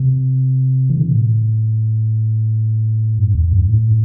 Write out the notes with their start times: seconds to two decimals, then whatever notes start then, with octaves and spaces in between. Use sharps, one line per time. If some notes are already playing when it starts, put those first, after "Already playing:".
Already playing: C3
0.90 E3
0.97 D3
1.05 C3
1.12 A2
3.18 G2
3.35 E2
3.53 G2
3.69 A2